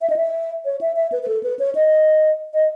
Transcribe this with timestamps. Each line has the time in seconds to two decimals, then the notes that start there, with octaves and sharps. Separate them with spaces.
0.01 E5
0.10 D#5
0.16 E5
0.65 C#5
0.81 E5
0.96 E5
1.12 B4
1.23 B4
1.28 A4
1.43 B4
1.59 C#5
1.75 D#5
2.54 D#5